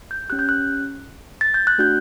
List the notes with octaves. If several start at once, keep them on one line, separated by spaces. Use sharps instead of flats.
G6
C#4 G4 F#6
G6
F#6
A6
G6
F#6
A3 D4 F#4 G6